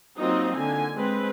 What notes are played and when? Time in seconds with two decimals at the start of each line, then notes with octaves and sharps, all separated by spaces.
0.18 F#3 A#3 C4 D#4 F4 D#5
0.56 D3 A#3 G#5
0.95 G#3 C4 B4